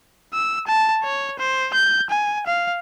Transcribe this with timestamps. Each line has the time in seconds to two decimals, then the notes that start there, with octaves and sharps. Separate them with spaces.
0.34 E6
0.67 A5
1.04 C#5
1.39 C5
1.74 G6
2.10 G#5
2.46 F5